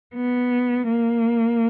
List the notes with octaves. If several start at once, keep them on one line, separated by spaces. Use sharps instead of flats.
B3
A#3